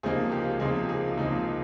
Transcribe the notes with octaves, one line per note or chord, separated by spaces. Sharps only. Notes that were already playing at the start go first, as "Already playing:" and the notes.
C#2 C3 F3 A#3 D#4 G#4
G4
C#2 C3 F3 A#3 D#4 G#4
G#4
C#2 C3 F3 A#3 D#4